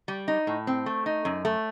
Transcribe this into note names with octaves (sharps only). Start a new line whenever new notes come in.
G3
D#4
A2
C4
A3
D#4
F#2
A3